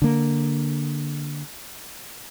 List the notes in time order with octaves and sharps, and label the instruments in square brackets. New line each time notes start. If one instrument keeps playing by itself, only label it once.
[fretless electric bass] D3 A#3